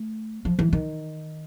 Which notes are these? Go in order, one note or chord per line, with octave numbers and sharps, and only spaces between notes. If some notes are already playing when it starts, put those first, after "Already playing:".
Already playing: A3
F3
E3
D#3